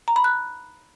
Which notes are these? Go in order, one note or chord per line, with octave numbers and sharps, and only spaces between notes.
A#5
B5
F#6